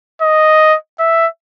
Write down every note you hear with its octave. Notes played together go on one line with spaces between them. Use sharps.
D#5
E5